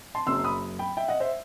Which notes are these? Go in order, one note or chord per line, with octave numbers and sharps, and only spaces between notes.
A5 C6
F#1 F#2 F#3 C6 E6
B5 D#6
G5 B5
E5 G5
D#5 F#5
C5 E5